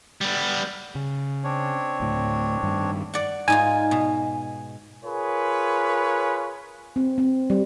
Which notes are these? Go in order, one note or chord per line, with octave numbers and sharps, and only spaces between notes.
G3 B3
C#3
C4 D4 C#5
D2 A2
G2 D#3
D5 F#5
G#2 D#4 F4 G#5
B2
F4 G#4 A#4 B4 C#5
C4
C4
G3